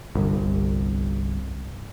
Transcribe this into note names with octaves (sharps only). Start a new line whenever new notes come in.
G1 C2